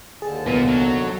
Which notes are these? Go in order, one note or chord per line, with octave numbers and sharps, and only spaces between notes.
D#2 D3 G#4 A5
C2 A#2 E3 B3
F#3